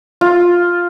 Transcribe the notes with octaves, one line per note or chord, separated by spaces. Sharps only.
F4